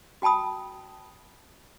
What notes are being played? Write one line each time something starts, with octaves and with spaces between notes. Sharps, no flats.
F#4 G5 A5 B5 D#6